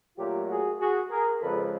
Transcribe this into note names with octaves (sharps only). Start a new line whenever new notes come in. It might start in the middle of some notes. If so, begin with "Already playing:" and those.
A#2 F#3 A3 F4 G4
F#4 G#4
F#4 G#4
G#4 A#4
F2 C#3 F3 G#3 A4 B4